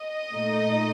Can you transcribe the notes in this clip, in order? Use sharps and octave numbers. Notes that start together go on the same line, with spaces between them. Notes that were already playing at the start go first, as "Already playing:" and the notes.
Already playing: D#5
A#2 A3 D#4